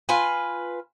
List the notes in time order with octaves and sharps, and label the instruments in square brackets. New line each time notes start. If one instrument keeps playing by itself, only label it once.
[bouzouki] F4 B4 G#5